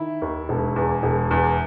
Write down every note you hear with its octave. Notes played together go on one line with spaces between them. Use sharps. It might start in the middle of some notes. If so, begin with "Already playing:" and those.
Already playing: D#3 E4
D#2
E1
E2
E1
E2